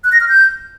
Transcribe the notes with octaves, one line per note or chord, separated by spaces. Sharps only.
F#6
A#6
F6
G6